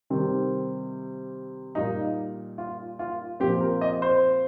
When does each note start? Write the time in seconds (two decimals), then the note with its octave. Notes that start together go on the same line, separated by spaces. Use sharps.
0.10 C3 D#3 G3 C4
1.75 A#2 G3 A#3 D#4
2.58 F4
2.99 F4
3.40 A#2 F3 C4 G4
3.61 A#4
3.81 D#5
4.02 C5